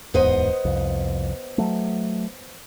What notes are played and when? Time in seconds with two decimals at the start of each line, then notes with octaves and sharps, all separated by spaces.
0.14 D1 E2 G#2 B3 C5 D#5
0.65 C2 F2
1.58 F#3 A3